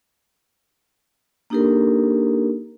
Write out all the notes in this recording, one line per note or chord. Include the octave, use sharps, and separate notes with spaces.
A#3 D4 D#4 G4 A4 A#4